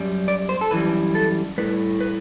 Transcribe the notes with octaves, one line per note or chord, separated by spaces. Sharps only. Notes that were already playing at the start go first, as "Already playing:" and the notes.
Already playing: F#2 G3
D5
C5
A4
F#2 E3 G3 B4
A4
A2 G3 B4
B4